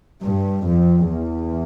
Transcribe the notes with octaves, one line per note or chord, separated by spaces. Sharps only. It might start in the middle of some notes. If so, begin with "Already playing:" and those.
G2
F2
E2